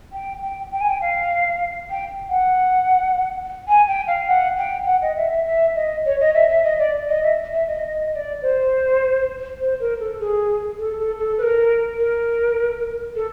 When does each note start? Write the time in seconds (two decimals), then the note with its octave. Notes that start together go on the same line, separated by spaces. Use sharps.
0.13 G5
0.42 G5
0.72 G5
0.81 G#5
0.89 G5
1.02 F5
1.90 G5
2.30 F#5
3.68 G#5
3.87 G5
4.07 F5
4.27 F#5
4.57 G5
4.86 F#5
5.02 D#5
5.17 E5
5.31 E5
5.46 E5
5.75 D#5
6.05 C#5
6.20 D#5
6.34 E5
6.49 E5
6.64 D#5
6.79 D5
7.09 D#5
7.23 E5
7.53 E5
7.68 D#5
7.83 D#5
8.12 D#5
8.16 D5
8.42 C5
9.61 C5
9.80 A#4
10.00 A4
10.20 G#4
10.79 A4
10.98 A4
11.18 A4
11.38 B4
11.43 A#4
11.97 A#4
13.16 A4